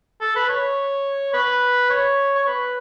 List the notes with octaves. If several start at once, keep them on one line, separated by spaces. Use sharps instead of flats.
A4
B4
C#5
B4
C#5
C#5
B4